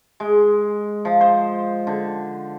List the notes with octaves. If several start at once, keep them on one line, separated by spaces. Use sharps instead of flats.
G#3
F3
C5
D3